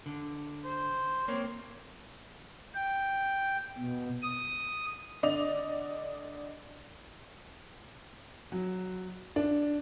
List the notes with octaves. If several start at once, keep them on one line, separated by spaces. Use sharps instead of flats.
D3
C5
A#3 C4 C#5
G5
B2
D#6
D3 D5 D#5 F7
F#3
D4